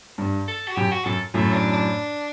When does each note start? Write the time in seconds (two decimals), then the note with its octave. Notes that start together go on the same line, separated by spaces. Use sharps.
0.18 G2
0.48 A4
0.68 F#4
0.76 F#2 G4
0.91 F#4
1.05 F#2 A4
1.34 F#2 A2 A3
1.54 D4
1.73 D4